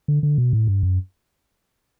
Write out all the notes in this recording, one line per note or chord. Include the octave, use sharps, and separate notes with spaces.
D3
D3
B2
A2
G2
F#2